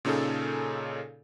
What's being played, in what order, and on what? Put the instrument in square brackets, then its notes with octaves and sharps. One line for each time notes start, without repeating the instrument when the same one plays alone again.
[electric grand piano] A#2 C#3 C#4 D#4 G#4 A4